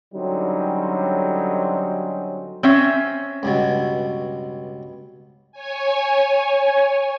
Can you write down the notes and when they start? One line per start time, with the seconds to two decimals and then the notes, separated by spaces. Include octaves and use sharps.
0.14 D3 F#3 G3 C4 C#4 D#4
2.63 C4 C#4 E5
3.43 C#2 G2 B2
5.52 C#5 G#5